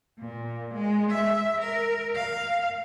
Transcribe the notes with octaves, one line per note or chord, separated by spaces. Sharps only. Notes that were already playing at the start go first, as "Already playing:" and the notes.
A#2
G#3
E5
A#4
F5